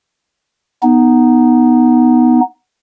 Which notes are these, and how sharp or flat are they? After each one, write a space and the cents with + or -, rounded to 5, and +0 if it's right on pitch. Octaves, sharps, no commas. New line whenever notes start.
B3 +0 D#4 +0